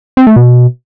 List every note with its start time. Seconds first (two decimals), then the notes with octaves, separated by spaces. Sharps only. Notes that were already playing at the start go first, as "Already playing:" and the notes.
0.17 C4
0.27 A3
0.36 B2